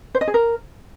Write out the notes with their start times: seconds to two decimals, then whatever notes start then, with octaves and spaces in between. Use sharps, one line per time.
0.15 C5
0.21 D#5
0.28 G#4
0.34 A#4